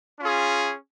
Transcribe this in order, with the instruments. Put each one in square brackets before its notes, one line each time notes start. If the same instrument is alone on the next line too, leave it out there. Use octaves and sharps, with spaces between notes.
[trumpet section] C#4 F4 G#4